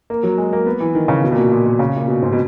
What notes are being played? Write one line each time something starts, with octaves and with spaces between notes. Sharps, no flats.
A#3
F#3
G#3
A#3
B3
E3
D#3
C#3
B2
A#2
B2
A#2
A#2
C#3
A#2
B2
G#2
B2